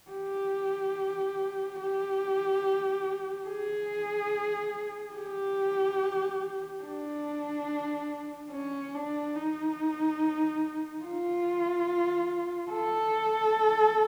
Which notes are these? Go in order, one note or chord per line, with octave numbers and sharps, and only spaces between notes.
G4
G4
G#4
G4
D4
C#4
D4
D#4
F4
A4